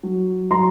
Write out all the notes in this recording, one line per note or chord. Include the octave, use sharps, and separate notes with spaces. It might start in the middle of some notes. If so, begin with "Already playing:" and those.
F#3
F#3 A#5 C6